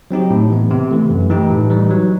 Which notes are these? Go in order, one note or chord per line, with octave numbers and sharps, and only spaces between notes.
F#3 C4 D#4 G4
A2
E3 B3
C3
E3 A3
F#2
E3 A3 D#4 G4
A2
E3 G3 D#4
F#3